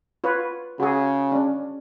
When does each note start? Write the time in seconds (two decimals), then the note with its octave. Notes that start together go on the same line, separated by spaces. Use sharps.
0.24 F4 B4 C#5
0.80 C#3 F#4 G#4
1.32 C#4 D4